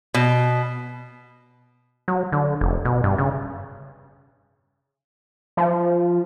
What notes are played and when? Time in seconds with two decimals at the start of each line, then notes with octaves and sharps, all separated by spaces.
0.14 B2
2.08 F#3
2.32 D3
2.61 F1
2.85 B2
3.04 G2
3.18 C#3
5.57 F3